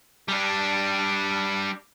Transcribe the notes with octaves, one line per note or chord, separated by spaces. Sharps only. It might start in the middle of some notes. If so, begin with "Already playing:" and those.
G3 D4